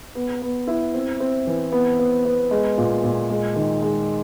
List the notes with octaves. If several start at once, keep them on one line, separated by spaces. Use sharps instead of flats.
B3
B3
E4
C4
C4
E3
B3
B3
B3
G#3
A#2
A#2
G#3
D#3
G#3